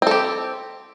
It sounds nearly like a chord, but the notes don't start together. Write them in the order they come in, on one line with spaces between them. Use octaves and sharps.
C4 A4 G4